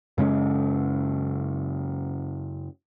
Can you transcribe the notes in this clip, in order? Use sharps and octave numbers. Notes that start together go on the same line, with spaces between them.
F#2 C#3 G#3 C#4